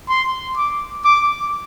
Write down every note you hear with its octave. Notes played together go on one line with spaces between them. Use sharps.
C6
D6
D6